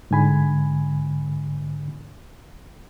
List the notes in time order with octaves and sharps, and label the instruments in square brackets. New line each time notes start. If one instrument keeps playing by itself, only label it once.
[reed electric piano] G#2 D3 G#5 B5